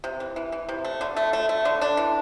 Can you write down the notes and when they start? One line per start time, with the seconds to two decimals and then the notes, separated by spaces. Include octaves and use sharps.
0.04 C3
0.20 E3
0.36 E3
0.52 E3
0.69 C3
0.85 A3
1.01 D3
1.16 A3
1.33 A3
1.49 A3
1.65 D3
1.81 D4
1.97 E3